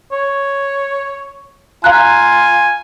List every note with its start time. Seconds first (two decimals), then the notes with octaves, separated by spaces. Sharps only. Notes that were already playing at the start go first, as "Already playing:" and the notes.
0.12 C#5
1.84 F4 F5 G#5 A#5 F#6